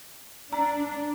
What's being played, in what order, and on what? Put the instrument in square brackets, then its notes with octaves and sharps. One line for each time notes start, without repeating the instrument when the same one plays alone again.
[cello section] D4 [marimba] A#5